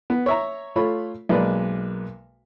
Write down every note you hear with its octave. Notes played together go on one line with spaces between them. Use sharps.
B3
C#5 E5 A#5
A3 F4 C#5 B5
B1 G#3 A#3 B4 D5